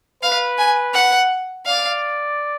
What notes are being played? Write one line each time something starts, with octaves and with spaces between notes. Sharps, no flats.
B4 F5
G#5
F#5
D5 F5